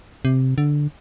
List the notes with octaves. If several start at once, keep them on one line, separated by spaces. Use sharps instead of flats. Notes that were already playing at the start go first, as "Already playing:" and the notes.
C3
D3